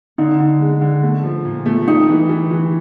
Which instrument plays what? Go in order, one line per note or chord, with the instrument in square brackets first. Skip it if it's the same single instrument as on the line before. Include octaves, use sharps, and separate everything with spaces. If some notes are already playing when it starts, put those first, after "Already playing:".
[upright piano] D3 [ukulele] D#4
[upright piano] D3
G#3
D3
A3
F3
A#2
A3
[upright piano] G3 [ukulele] D#4
[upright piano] E3
E3
E3